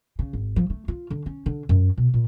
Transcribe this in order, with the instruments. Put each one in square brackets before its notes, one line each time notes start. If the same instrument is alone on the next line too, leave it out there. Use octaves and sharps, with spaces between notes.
[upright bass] C#3
G#1
F3
A3
F4
D3
C#4
D3
F#2
B2
A#2